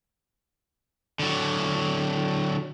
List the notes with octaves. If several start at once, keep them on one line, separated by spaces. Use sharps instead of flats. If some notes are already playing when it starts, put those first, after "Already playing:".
D3 F#3